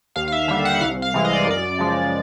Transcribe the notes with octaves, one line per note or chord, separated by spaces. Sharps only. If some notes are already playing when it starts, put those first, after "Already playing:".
D#2 F5
F5
E5
D3 G3 E5
F#5
C2 F5
F5
C3 E3 G#3
D#5
D5
F#2 D5
C#3 F3 G#3